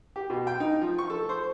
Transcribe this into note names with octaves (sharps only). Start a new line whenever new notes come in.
G4
B2
G5
D#4
F3
C#6
A4
C5